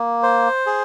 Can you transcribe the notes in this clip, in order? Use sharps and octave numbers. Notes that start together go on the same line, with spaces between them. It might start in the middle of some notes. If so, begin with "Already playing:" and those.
Already playing: A#3
C5
G#4